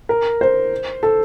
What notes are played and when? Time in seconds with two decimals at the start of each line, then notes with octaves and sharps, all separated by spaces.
0.09 A#4
0.41 C5
1.03 A4